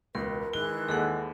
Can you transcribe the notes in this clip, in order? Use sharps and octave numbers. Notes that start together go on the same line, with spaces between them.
E1 C#2 A#4 B4
D#3 E3 G#3 F#6 G7
D#2 G#4 A4 F#5